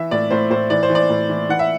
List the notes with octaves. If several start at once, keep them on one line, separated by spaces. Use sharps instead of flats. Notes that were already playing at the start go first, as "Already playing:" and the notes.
Already playing: E3 E5
A2 D5
A2 C5
A2 C5
E3 D5
C5
E3
D5
A2
E3
E3 F#5
E5